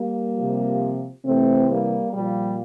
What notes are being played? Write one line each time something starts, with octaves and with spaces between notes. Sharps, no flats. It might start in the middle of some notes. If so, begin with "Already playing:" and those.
Already playing: G3 A#3
F3
C3
C3 E3 A3 C4
G3 A#3
A#2 F3 G3